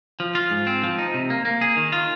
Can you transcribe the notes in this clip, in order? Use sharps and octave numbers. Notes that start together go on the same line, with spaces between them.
F3
F4
G#2
C4
F3
D#4
C3
A#3
A#3
G#4
D#3
F4